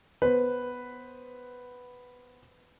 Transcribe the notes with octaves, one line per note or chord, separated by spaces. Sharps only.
B3 B4 C5